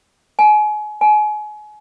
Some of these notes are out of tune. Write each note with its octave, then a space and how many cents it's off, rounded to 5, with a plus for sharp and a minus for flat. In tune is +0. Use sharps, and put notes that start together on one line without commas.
G#5 +30
G#5 +30